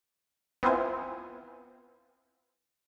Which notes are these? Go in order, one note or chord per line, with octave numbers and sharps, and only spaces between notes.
B3 C4 E4 F4 C5 G#5